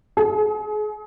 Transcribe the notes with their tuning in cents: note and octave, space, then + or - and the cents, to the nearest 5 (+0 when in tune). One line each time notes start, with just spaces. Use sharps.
G#4 +35